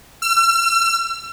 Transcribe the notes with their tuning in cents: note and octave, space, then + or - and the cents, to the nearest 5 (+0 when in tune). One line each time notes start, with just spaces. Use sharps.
E6 +45